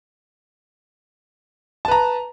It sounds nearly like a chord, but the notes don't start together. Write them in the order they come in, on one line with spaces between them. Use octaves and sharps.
A5 B4 A#5